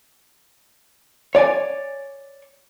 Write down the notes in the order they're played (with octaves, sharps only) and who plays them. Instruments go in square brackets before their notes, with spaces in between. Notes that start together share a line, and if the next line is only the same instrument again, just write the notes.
[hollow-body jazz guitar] C#5 D5 F#5 G#5